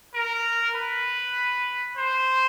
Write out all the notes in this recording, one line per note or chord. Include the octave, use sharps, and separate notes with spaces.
A#4
B4
C5